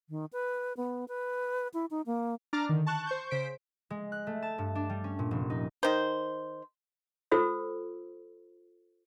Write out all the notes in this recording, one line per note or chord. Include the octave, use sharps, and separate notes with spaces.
D#3
B4
B3
B4
E4
D#4
A#3
D4 A#5 D6 F6 A6
D3 D#3
A5 C#6 F#6
C5 C#6 G6
C#3 C5 B6 D7
G#3
F#6
A3
A5
G2
D4
G3
C#4
A#2
F1
D#4
D#3 C5
F4 A4 C5 E6